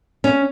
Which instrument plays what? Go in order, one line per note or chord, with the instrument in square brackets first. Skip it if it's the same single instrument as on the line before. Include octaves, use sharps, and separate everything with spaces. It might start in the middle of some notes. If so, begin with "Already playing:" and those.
[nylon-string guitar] C#4